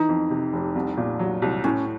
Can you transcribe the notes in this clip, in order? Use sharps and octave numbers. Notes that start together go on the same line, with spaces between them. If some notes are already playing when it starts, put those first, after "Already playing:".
Already playing: E3 D#4
F2
C3
F1
C2
A#2
F#3
C2
A2 C#4